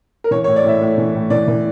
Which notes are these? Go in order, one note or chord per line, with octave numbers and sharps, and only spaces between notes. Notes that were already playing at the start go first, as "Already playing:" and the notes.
A#4
E3 C#5
C#5
A2
D5
A2 E5
A2
E3
A2
E3 D5
E3